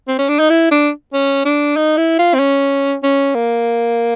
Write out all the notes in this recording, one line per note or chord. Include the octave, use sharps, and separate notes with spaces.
C4
C#4
D4
D#4
E4
D4
C#4
D4
D#4
E4
F4
C4
C#4
C#4
A#3